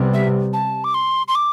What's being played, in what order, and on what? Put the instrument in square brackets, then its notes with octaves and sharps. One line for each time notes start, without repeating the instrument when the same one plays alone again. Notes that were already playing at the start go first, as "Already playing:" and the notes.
Already playing: [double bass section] C3 G3 B3
[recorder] E5
A5
D6
C6
C6
D6